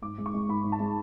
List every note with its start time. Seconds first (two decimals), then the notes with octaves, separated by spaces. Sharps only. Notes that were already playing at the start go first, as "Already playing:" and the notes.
0.02 G#2 D6
0.18 G#3
0.26 C#6
0.34 G#3
0.49 G#2 B5
0.64 G#2
0.72 A5
0.80 G#3